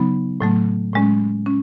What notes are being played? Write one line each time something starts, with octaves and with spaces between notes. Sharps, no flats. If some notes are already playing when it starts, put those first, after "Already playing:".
Already playing: C#3 F#3 B3 D#4
A2 F#3 A3
A2 G#3 C#4
C#4